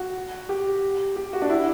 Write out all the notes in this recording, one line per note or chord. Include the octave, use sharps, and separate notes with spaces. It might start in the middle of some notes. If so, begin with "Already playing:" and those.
Already playing: F#4
G4
G4
F#4
D4
E4